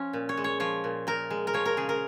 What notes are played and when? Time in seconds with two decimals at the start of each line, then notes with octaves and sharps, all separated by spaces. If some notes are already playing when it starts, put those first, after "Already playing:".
Already playing: F3 C#4
0.13 A#2
0.29 C#5
0.37 G#3
0.44 C#5
0.60 F3 C#5
0.84 A#2
1.07 A#2 A#4
1.30 G#3
1.47 A#4
1.54 F3 C#5
1.65 A#4
1.77 C#3 G#4
1.89 A#4